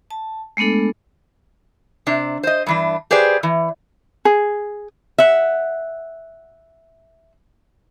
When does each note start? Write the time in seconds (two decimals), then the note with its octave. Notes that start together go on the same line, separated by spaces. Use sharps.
0.11 A5
0.57 G#3 A3 B3 D4 A4
2.07 C3 D4
2.43 C5 D#5
2.67 G2 E3 D4
3.11 G4 G#4 B4 C5 D5
3.43 E3
4.25 G#4
5.18 E5 F#5